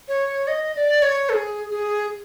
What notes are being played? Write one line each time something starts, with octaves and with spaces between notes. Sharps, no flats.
C#5
D#5
D5
C#5
A4
G#4
G#4